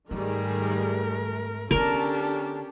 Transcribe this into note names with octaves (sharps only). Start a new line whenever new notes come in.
G#2 D#3 G3 A3 G#4 A#4
D3 B3 C#4 D4 G4 A4 A#4 A5